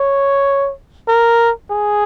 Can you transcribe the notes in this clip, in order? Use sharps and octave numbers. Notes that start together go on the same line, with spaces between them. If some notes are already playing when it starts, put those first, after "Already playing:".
Already playing: C#5
A#4
G#4